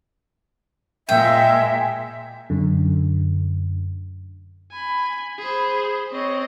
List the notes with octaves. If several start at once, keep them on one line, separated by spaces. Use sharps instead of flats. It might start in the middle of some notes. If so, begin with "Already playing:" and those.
A#2 G#3 E5 G5
F#2 D3
G#5 B5
G#4 C5
C4 C#5 D#5